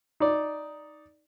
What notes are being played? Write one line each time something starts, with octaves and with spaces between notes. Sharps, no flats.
D#4 D5